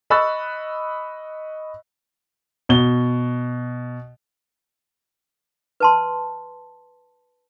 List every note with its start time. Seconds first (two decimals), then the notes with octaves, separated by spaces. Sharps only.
0.10 D#5 B5 C#6 E6 F#6 A6
2.69 B2 G7
5.80 B4 A5 C6